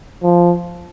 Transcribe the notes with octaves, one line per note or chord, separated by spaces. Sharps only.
F3